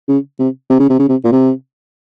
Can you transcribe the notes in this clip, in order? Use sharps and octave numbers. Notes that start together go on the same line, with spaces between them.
C#3
C3
C3
C#3
C3
C#3
C3
A#2
C3